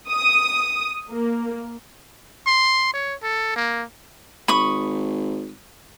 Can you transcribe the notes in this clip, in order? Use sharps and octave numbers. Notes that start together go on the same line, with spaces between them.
D#6
A#3
C6
C#5
A4
A#3
G#1 B5 C#6 D#6